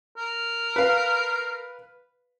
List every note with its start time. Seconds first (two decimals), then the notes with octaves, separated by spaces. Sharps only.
0.17 A#4
0.76 B4 F5